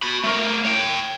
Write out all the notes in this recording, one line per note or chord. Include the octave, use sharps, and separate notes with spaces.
F#4 B5
A3 A#4
C#5 G5